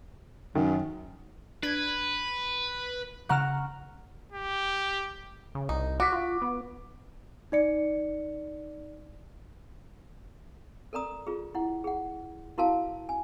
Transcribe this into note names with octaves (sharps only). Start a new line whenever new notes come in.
F#2 D#3
D4 B4 G#6
C#3 F#5 A#5 C#6 F6
G4
C#3
C2 D#4
F#4 D6 B6
F4
B3
D#4 D5 C#7
A4 A#4 D5 A#5 D#6
F4 G#4
E4 F#5
G#4 F#5
E4 F#4 A#4 F5 A5
G#5